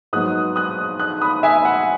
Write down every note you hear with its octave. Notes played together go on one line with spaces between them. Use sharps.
G#2 F#3 B3 D#6 F#6
D#6 F#6
D#6 F#6
B5 D#6
E5 G#5
F#5